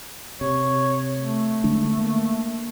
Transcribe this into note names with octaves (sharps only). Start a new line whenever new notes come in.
C3 C#5
A3
D3 G#3 D4
A#3